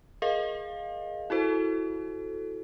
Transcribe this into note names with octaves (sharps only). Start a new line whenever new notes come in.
G#4 A#4 D#5 F5
E4 F#4 A4 C5